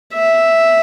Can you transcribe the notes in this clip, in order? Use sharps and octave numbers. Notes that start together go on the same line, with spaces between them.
E5